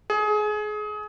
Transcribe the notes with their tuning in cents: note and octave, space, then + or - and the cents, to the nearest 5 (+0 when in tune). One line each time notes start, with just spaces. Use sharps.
G#4 +25